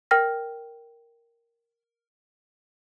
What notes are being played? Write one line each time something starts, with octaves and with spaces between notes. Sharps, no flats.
A#4 G5 F6 A#6